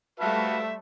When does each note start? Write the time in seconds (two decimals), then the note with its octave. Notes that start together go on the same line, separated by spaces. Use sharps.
0.20 G3 A3 F#4 B4 C5 E5 F5 A5